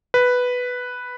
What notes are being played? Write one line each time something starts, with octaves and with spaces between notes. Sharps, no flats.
B4